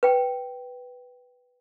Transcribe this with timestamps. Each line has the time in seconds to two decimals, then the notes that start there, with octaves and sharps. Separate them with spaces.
0.03 B4 G5